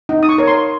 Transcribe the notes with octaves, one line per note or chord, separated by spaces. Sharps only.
D#4
D#6
C#6
A#4 C#5
C6